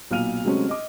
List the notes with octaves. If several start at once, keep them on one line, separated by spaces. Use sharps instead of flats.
B1 A#2 F5 F6 D#7 F7
C3 F#3 G#3 A3 C4 C#4
D#5 D6